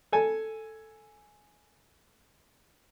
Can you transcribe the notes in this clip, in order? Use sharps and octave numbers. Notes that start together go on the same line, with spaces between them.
A4 G#5